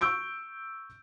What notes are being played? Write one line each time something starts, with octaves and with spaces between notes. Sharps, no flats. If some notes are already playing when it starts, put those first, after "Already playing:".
C#6 E6 G6 D7